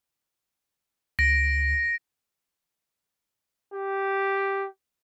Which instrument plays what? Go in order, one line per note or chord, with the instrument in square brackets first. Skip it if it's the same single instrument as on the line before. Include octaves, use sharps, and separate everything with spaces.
[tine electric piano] D2 [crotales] A#6 D7
[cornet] G4